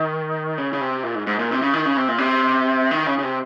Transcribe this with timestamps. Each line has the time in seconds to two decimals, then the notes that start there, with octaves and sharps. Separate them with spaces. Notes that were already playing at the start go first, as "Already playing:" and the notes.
Already playing: D#3
0.58 C#3
0.73 C#3
0.81 C3
1.03 A#2
1.15 G#2
1.27 G#2
1.39 A#2
1.51 C3
1.62 C#3
1.74 D#3
1.85 C#3
1.97 C3
2.08 A#2
2.18 C3
2.91 D#3
3.06 C#3
3.18 C#3
3.23 C3